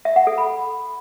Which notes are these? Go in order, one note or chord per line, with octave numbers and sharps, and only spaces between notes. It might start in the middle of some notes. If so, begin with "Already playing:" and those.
E5
F#5
A4
B5